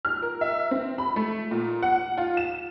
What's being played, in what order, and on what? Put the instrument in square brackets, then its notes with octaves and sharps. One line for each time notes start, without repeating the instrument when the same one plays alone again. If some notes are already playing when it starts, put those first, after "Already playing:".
[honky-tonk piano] F6
A#4
E5
C4
B5
A3
A#2
F#5
F4
E7